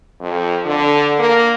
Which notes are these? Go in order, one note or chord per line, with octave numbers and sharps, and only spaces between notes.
F2
D3
A#3